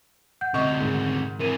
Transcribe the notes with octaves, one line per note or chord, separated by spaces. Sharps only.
F#5 G6
D2 C3 D#5 C#6
G#2 D#3
C3 E3 A#4 D#7